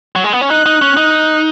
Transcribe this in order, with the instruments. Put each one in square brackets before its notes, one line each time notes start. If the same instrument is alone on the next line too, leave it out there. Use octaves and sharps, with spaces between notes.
[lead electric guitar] F#3
G#3
B3
C#4
[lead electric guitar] D#4 [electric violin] F#6
[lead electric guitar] D#4
C#4
D#4